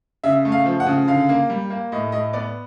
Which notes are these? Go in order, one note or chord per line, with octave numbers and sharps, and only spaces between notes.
C#3 E5
A3
F5
F3
F#5
C#3
D3 F5
A#3
G3
A#3
A2 D#5
A2 D#5
B3 D5